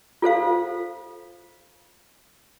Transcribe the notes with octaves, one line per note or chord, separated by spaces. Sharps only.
F4 A4 C5 F5